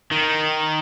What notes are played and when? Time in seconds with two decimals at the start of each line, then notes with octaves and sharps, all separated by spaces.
0.11 D#3